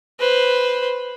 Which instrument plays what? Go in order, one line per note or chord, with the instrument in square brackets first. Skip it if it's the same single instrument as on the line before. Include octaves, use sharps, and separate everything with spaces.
[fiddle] B4 C5